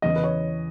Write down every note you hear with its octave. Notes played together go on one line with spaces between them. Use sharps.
E2 C#3 E3 D#5
B4
C#5